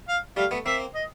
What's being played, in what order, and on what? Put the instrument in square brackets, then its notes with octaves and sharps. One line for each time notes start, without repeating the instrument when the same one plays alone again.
[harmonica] F5
[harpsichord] G3 A3 [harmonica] F5
[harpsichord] A3 B3
[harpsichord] A#3 C4 [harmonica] E5
[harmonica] D#5